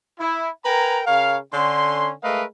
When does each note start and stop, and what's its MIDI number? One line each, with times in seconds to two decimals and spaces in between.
0.20 0.49 64
0.65 1.01 70
0.65 1.01 71
0.65 1.01 79
0.65 1.01 80
0.65 1.01 82
1.06 1.37 49
1.06 1.37 70
1.06 1.37 73
1.06 1.37 77
1.54 2.11 50
1.54 2.11 61
1.54 2.11 84
2.23 2.44 56
2.23 2.44 57
2.23 2.44 70
2.23 2.44 71
2.23 2.44 75
2.23 2.44 77